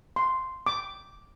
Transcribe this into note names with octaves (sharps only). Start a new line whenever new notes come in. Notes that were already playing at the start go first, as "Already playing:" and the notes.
C6
D6